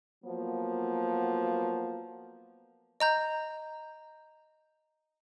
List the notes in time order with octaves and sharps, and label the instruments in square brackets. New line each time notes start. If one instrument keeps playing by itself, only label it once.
[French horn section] F3 F#3 A#3 B3
[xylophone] D#5 A#5 G6